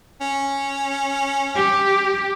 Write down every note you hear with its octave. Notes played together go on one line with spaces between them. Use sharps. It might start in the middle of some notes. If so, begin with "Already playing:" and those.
C#4
G4